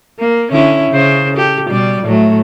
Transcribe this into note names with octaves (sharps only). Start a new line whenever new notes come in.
A#3
D3 C#4 E4
C#3 C5
G4 A4
B2 G3 D5
A2 F#3 A3